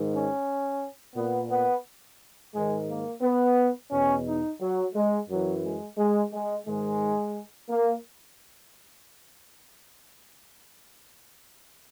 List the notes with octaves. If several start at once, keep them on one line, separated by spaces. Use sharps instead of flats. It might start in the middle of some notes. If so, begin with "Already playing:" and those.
Already playing: G#2 D#3
C#4
A#2 B3
B3
G#2 D#3 G#3
A#3
B3
E2 B2 C#4
D#4
F#3
G#3
F#2 E3 F#3
G#3
G#3
G#3
G#2 D#3 G#3
A#3